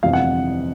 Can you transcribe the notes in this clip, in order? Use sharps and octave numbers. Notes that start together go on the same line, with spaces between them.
G1 F2 C3 E3 F5
F#5